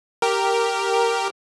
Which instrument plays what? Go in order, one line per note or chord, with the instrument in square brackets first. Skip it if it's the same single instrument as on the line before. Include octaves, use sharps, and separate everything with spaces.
[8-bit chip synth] G4 A#4